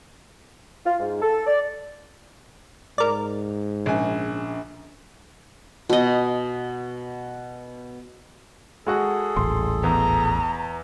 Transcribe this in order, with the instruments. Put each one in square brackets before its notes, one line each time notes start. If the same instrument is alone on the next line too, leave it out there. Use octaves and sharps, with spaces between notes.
[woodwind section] F4
G#2
A4
D5
[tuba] G#2 [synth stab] A#4 D5
[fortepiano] A#1 C#3 G#5
[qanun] B2 D#5
[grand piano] G#3 F#4 F#5 [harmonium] G#4 A4
[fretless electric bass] D#1 A1 [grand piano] C6
[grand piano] E2 [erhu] A#5